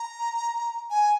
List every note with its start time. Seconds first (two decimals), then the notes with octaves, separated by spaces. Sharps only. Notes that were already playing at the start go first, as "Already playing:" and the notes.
Already playing: A#5
0.91 G#5